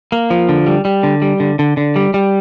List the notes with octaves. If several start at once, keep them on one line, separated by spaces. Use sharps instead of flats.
A#3
F3
D3
G3
G3
D3
G3
D3
D3
D3
G3
G3